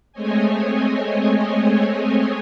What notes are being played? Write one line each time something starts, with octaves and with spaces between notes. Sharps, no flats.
G#3 A3 C4 C#5 D#5 G#5